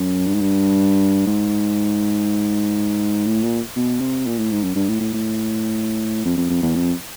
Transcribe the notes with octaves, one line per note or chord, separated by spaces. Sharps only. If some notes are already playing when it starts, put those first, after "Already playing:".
Already playing: F#2
G2
G#2
G2
G#2
A2
A#2
B2
C3
A#2
A2
G#2
F#2
G2
A2
A2
A2
F2
F2
F2
E2
F2